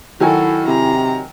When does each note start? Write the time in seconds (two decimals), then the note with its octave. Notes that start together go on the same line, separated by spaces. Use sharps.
0.20 D#3 F#3 E4 F#4 A4 G#5
0.67 C3 A#5